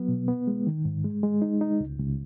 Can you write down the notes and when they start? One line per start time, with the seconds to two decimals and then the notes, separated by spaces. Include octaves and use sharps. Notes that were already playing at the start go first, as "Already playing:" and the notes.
Already playing: F#3 B3
0.08 B2
0.28 B3
0.47 G#3
0.67 D#3
0.85 G#2
1.04 G#3
1.23 G#3
1.42 D#4
1.61 D#4
1.80 C#2
1.99 C#2